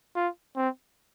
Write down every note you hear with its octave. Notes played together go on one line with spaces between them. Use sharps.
F4
C4